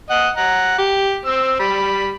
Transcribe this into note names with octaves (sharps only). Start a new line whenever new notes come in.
D#5 F#5
F#5 A#5
G4
C4 E6
G3 B5